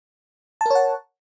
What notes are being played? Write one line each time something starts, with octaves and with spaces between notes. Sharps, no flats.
A#4 C#5 F#5 A5